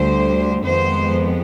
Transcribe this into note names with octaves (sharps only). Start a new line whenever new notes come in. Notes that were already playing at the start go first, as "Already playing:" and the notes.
Already playing: D2 D3 G3 C5
F2 D#3 G#3 B3 C5